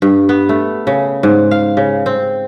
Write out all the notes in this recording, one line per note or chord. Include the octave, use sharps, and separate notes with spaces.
G2
B3
A3
C#3
G#2
F5
C#3
C4